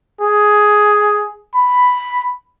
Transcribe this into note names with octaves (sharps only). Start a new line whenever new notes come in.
G#4
B5